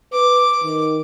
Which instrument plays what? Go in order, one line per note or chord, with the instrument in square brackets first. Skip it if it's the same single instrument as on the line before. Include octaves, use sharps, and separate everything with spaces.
[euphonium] B4 [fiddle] D6
[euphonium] D#3